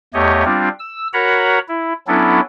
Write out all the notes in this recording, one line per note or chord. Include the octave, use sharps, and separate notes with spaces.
E2 A3 G4 C#5 D#5
G3 C4 D4 F4
E6
F#4 A#4 C#5 F#5 A#5 B5
E4
F#3 B3 C#4 D4 E4 A4